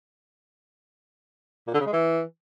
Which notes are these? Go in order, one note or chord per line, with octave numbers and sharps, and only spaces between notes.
A#2
D3
C#3
G#3
E3